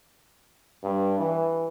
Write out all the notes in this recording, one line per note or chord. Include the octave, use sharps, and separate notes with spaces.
G2
E3